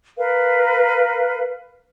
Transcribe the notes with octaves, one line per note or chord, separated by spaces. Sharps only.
A#4 B4 F5